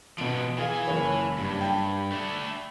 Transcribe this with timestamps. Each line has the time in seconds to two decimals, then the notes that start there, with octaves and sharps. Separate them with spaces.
0.18 B2 F3 B3 D7
0.58 E3 G#4 F5 G#5
0.85 F#1 C#5 B5
1.38 G2
1.61 G5 A5 B5
2.12 A3 D4